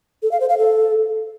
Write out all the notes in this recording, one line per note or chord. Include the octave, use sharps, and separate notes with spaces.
A4
F5
C5
F5
A4